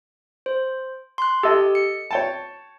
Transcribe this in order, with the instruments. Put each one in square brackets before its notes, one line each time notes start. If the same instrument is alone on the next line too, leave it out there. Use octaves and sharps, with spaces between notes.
[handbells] C5
C6 F#6
[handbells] G4 [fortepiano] A4 D#5
[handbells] C#7
[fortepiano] C#5 G5 A5